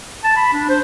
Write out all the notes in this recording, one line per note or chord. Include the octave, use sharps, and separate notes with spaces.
A5
B5
D4
C5